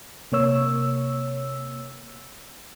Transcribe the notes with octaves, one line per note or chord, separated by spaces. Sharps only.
C3 A#3 C#5 E6